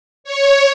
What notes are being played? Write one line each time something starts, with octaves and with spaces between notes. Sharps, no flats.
C#5